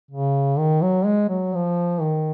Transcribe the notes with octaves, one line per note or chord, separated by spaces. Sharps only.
C#3
D#3
F#3
G#3
F#3
F3
D#3